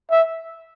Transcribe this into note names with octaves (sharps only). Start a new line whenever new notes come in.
E5